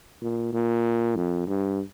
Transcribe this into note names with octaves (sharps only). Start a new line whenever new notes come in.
A#2
A#2
F2
G2